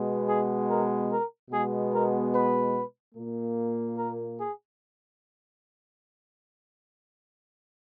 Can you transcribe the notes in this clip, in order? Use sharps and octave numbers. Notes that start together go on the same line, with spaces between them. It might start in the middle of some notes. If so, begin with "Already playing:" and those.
Already playing: B2 G#3 B3
G#4
A#4
A#4
B2 G#3 B3 G#4
A#4
B4
A#2 A#3
A#4
G#4